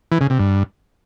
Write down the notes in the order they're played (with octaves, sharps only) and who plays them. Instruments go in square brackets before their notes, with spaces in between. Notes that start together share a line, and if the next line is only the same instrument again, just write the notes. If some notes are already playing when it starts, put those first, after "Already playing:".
[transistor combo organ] E3
C#3
C3
G2